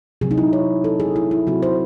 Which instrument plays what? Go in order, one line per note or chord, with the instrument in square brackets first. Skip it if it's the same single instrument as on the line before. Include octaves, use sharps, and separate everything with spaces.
[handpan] C3 F#3 C4 G#4
D#4
E4
C#5
A4
G#4
E4
E4
C3 F#3 C4 F#4
C5